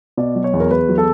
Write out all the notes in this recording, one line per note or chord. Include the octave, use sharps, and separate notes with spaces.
B2 D5
F#3
C#5
E2
A#4
E2 B4
F#3
A4